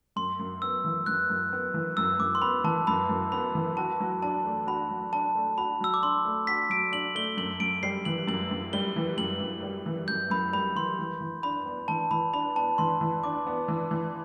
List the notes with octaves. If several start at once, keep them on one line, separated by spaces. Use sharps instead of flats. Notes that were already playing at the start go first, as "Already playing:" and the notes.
F#2 C6
F#2
B3 E6
E3
F#2 F#6
F#2
B3
E3
F#2 E6
F#2 D6
C6
B3 B5
E3 A5
F#2 B5
F#2
B3 B5
E3
F#4 A5
F#3
D4 A5
A3
F#4 B5
F#3
D4 A5
A3
F#4 B5
F#3 E6
D6
D4 C6
A3
F#4 B6
F#3 D7
D4 F#7
A3 G7
F#2 F#7
F#2 D7
G3 C7
E3 F#7
F#2 F#7
F#2
G3 G7
E3
F#2 F#7
F#2
G3
E3
F#2 G6
F#2 B5
G3 B5
E3 C6
E3
E3
D4 B5
B3
E3 A5
E3 B5
D4 B5
B3 A5
E3 C6
E3
D4 D6
B3
E3
E3